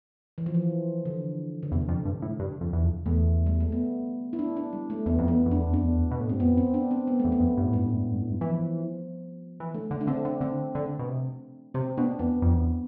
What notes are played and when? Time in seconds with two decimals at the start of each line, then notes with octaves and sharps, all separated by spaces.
0.38 E3
0.46 F3
0.54 E3
1.05 D3
1.63 D3
1.72 E2 C3
1.89 F2
2.05 G2
2.22 A2
2.39 G2
2.61 F2
2.73 E2
2.84 F2
3.06 E2 A3
3.46 G3
3.60 A3
3.72 B3
4.33 E4
4.39 D4
4.57 D4
4.73 G3
4.90 A3
5.06 E2 B3
5.19 F2
5.28 B3
5.32 E2
5.46 F2
5.51 D4
5.58 E2
5.71 F2 D4
5.85 E2
6.11 B2
6.20 A2
6.29 G2 C4
6.40 F2 B3
6.57 C4
6.74 D4
6.91 C4
7.08 B3
7.20 E2 A3
7.32 B3
7.40 F2
7.57 G2
7.66 A2
7.73 G2 G3
7.85 A2
7.94 G2
8.03 A2
8.13 G2
8.22 A2
8.31 G2
8.41 E3 F3
9.60 E3
9.74 D3 A3
9.91 D3 A3
10.01 D4
10.07 D3 C4
10.25 D3 D4
10.41 D3 C4
10.75 D3
10.99 B2
11.09 C3
11.74 C3 C4
11.97 B2 D4
12.19 E2 B3
12.42 F2
12.53 E2